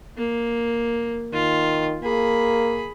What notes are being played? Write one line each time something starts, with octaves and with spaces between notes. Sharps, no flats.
A#3
D#3 F4
A#3 G#4 B5